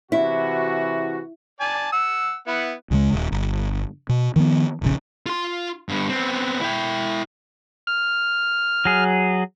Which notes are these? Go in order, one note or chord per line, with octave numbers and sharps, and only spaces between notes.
C3 E3 E4 F#4
D5 G#5 A5
F#5 E6
B3 E4 F#5
C#2 C#3 E3 G#3
D#1
G1
B2
D#3 F3 A#3 B3
E1 A#1 G#2 C#3
F4 C6
G2 B3
B3 C4
E4 G5
F6
F#3 G#4